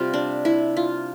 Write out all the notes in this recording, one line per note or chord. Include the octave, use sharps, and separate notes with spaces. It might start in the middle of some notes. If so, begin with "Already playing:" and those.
Already playing: C3 G3 C4 F4
D4
E4
F4